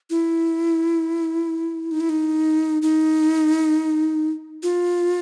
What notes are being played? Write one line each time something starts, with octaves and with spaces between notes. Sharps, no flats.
E4
D#4
E4
D#4
D#4
F4